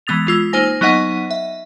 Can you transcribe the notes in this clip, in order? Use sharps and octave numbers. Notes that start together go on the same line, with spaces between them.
E3 G#3 B3 D#6 A6 F7
G#3 F4 E6
A#3 D#4 C5 G#5 A#6
F#3 B3 D#4 D#5 F#5
E5